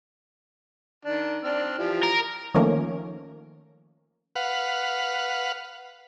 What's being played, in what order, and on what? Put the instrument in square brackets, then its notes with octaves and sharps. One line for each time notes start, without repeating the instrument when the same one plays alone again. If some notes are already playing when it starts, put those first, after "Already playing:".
[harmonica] D#3 D4
C4 D4 F6
E3 F3 G4
[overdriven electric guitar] A#4
[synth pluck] D#3 F3 A3 A#3 C#4
[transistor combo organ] B4 F5 F#5